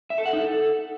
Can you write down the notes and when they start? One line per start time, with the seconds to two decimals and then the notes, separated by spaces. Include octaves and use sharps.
0.10 E5
0.18 A4
0.26 F#5
0.33 D#4
0.41 A4